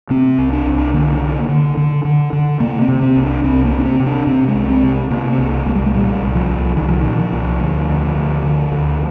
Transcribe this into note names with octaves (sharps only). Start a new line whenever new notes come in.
C3 C4
C2
D4
C2
D4
D3 A#3
D3
D3
D3
D3
D3
C3 A#3
C4
C3
C4
C2
D4
C2 C4
A#3
C3
D4
C4
C3
D4
C3 C4
G#3
C2
C4
C3
C3 A#3
C4
C2 A#3
C2 G#3
G3
G#3
A#2 G3
C2
F3
C2
C2 D#3
F3
A#2 D#3
F3
C2
D2
D3
D2
D3
D2